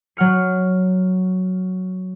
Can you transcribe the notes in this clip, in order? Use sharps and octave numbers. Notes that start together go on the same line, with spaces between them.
F#3 F#5 F6 C#7